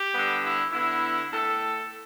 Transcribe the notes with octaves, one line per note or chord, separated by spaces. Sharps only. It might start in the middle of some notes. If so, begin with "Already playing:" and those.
Already playing: G4
D3 G3 B3
E4
D3 B3 E4
A2 A3 A4